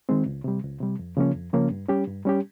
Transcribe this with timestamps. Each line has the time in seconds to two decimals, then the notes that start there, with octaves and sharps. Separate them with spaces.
0.09 D#3 G#3 C4
0.26 C#2
0.44 C3 G3
0.63 C#2
0.80 C3 G3
0.99 F2
1.17 C#3 F3 A#3 C#4
1.34 F2
1.53 C#3 F3 A#3 C#4
1.70 G2
1.89 G3 C#4 G4
2.07 G2
2.25 G3 C#4 G4